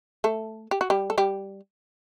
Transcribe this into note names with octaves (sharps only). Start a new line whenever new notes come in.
A3 A4
G4
F#4
G3 G4
A4
G3 G4